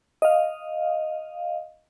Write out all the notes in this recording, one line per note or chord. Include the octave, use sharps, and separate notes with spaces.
D#5 F5